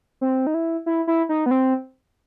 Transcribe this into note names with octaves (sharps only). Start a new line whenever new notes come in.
C4
D#4
E4
E4
E4
D#4
B3
C4